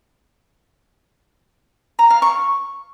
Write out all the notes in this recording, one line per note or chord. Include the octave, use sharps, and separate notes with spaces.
A#5
F5
C#6